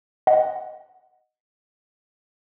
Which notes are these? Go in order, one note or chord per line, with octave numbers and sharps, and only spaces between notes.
D#5 F#5